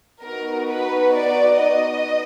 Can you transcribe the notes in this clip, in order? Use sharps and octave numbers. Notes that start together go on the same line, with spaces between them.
B3 D#4 F#4 A#4
B4
D5
D#5